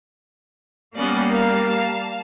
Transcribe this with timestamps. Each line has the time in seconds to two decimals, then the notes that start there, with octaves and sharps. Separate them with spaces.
0.95 G3 A#3 B3 C#4 D5
1.30 A#4 F5 A5